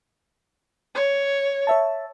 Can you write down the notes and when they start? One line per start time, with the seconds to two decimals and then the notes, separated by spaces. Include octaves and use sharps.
0.95 C#5
1.67 C#5 E5 A5